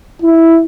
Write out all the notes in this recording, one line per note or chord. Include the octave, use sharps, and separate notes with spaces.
E4